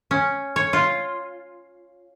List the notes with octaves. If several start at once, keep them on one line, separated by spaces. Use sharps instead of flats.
C#4
C#5
F4